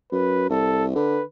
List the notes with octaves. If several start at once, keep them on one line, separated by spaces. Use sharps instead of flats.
F#2 B4
C2 A4
D3 B4